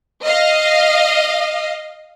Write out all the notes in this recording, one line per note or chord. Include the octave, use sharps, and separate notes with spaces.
D#5 F5